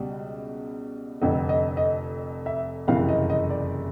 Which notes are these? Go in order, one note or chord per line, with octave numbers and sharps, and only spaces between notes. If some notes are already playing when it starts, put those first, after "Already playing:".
Already playing: C#2 B2 G3
F1 F2 D3 D#5
D#5
D#5
E5
F#1 F2 C3 E3 F5
D#5
D#5
D5